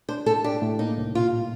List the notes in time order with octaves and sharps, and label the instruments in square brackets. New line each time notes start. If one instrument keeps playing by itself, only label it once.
[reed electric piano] D4 [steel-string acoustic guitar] C5
[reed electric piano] A2 [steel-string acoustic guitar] A4
[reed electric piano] D4 [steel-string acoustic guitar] G4
[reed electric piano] A2
[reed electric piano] A#3 [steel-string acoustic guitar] D#4
[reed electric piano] C2
[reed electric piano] A#2 [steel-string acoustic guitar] F4